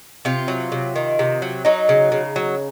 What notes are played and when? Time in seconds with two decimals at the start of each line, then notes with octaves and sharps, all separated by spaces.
0.25 C3 F4
0.48 F#3
0.72 C3
0.96 D#3
1.19 C3
1.42 F#3
1.65 F#3 D#4
1.89 C#3
2.12 C#3
2.36 F#3